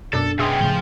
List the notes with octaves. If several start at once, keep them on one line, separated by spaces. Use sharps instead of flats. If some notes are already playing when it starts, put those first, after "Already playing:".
F#2 B2 D4 A4
B2 C#4 G#4 E5 G5 C6 D#6
A2 C#3 F3 C6